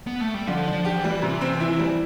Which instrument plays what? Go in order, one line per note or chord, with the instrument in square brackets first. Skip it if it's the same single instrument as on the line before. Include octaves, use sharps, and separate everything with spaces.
[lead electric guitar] B3
A3
G3
[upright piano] D3 [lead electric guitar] F3
[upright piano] D4
[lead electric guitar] F3
[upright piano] G4
[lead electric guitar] E3
[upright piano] G3
C3
C4
E4
G3